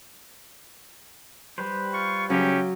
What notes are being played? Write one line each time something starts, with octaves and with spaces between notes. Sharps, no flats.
G3 B4 C5
F4 C#6
C#3 F#3 C#4 G4